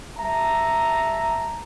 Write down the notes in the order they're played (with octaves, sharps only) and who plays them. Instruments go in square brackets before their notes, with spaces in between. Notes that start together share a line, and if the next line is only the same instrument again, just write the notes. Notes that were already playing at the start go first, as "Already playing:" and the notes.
[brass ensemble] G3 E5 A5 A#5